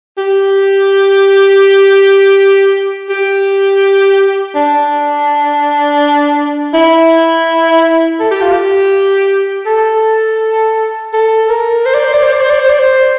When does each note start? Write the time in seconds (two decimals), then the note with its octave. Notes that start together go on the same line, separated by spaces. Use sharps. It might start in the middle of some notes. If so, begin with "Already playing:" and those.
0.18 G4
3.09 G4
4.55 D4
6.74 E4
8.20 A4
8.31 G4
8.42 F4
8.52 G4
9.66 A4
11.13 A4
11.49 A#4
11.86 C5
11.94 D5
12.05 C5
12.14 D5
12.23 C5
12.32 D5
12.41 C5
12.50 D5
12.60 C5
12.69 D5
12.79 C5